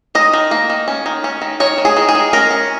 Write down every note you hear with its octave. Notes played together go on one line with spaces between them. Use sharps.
D#3 D#5
D#3
A#3
D#3
C#4
D#3
C#4
D#3
D#3 C#5
D#3
G#4
D#3
G#4
D#3
C#4 A#4
C#4